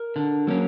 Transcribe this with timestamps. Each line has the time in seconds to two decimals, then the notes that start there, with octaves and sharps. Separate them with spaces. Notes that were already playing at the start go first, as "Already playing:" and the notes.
Already playing: A#4
0.16 D3
0.47 F#3 A#3 C#4